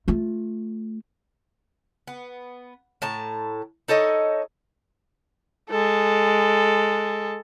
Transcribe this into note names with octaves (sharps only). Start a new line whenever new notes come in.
A3 F4
B3
A2 A5 A#5
D#4 A4 C#5 D#5
G#3 A4